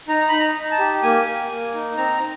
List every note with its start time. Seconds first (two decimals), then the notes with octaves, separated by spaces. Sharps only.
0.08 D#4 A#5
0.29 D#4 B5
0.40 A#5
0.55 D#4
0.71 A5
0.79 G4
1.03 A#3 G#5
1.26 A#3
1.50 A#3
1.74 D#4
1.97 C4 A#5